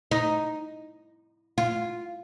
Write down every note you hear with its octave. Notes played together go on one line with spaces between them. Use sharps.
D#4
F4